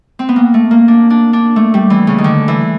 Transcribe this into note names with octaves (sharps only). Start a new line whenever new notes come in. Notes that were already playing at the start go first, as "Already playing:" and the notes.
C4
B3
A#3
A3
A#3
D4
D4
D4
A3
G3
E3
C#3
D#3
D3
E3